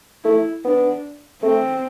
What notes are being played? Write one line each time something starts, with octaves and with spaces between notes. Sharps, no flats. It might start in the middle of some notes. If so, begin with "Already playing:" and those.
A3 E4
B3 D4
A3 C4